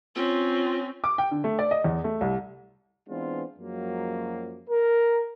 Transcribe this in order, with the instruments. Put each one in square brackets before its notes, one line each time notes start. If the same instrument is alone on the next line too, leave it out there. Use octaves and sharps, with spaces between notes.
[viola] C4 C#4 [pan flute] F4
[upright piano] D6
G5
D3
A3
D5
D#5
E2
A3
C2
[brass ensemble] E3 G#3 B3 C4 D4 F4
F#2 F3 F#3 G#3 A#3
A#4